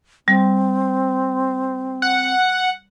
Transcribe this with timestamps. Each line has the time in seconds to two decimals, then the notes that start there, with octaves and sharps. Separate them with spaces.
0.28 G3 C4
2.02 F#5